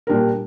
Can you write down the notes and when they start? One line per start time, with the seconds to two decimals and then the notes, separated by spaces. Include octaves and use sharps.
0.07 A#2 G3 D4 G4 A#4